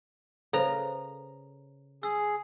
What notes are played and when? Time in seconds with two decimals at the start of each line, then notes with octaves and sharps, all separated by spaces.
0.53 C#3 A4 B4 C5 A#5
2.03 G#4 E6